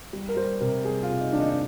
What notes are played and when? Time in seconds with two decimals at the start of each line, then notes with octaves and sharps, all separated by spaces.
0.13 G3
0.29 A#4
0.37 G3 C5
0.61 C3 A#4
0.85 G3 G#4
1.03 F4
1.09 C3
1.21 D#4
1.32 D#3 D4
1.40 D#4
1.50 D#4